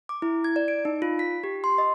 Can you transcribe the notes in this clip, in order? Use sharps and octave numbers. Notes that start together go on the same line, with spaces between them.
D6
E4
G#6
D5
D7
D#4
F4
B6
G4
C6
D#5